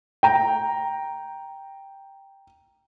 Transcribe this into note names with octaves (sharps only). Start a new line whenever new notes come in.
G5 A#5